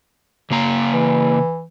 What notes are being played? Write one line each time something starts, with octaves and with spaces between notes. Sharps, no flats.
C#3 A#3 A#5
E3